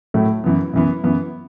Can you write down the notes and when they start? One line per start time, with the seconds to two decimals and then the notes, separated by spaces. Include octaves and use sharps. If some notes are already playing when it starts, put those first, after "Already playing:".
0.14 A2 F#3 A3
0.44 F#2 E3 B3
0.74 F#2 E3 B3
1.04 F#2 E3 B3